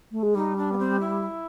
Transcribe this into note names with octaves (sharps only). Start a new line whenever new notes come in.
A3
G#3
G3 D#4
D4
B3
C4
E4